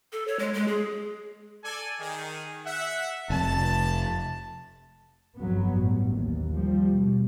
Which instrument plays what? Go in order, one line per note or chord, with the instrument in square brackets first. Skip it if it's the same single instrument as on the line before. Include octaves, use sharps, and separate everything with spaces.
[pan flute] A4
C#5
G#3
G#3
G#4
[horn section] A4 D5 G#5
D#3 G#4
E5 F#5
[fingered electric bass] F1 [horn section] A5
[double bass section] G1 F2 F#3 B3
A1 G2
D#2
F3 G3
B2